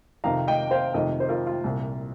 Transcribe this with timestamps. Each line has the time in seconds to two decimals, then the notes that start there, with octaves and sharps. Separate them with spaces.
0.24 F2 C3 D#3 F5 A#5
0.48 D#5 G5
0.71 C5 F5
0.94 F2 C3 D#3 A#4 D#5
1.20 C5
1.29 F4 A#4
1.47 F4
1.64 C2 A#2